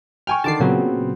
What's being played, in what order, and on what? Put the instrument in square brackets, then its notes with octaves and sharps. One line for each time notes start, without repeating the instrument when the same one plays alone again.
[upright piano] G5 G#5 C#6 [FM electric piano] F6
[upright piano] D3 D#3 [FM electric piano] A5 D6 C7
[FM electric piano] A#2 C#3 F#3 [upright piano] B3 C4